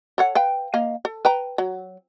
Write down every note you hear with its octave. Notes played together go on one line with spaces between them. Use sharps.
A4 C#5 F#5
B4 F5 G5
A#3 D#5 F5
A4
B4 G5 A#5
F#3